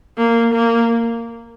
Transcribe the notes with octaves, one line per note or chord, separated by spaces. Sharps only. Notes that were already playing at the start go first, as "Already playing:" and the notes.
A#3
A#3